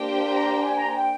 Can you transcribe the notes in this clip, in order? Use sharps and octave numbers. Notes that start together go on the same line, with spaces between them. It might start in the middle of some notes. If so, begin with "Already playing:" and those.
Already playing: A#3 D4 G4 C5 G5
A#5
G#5
A#5
G#5
G5